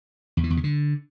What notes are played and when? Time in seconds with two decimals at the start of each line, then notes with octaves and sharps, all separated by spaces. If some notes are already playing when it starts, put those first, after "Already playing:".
0.37 E2
0.44 E3
0.50 E2
0.57 C#3
0.64 D3